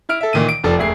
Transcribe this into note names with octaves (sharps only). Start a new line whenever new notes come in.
E4 F6 D7
A4 E5
A#2 D#3 E3 D#7
D7
F1 F3 A4 D5
E1 A3 G#4 C7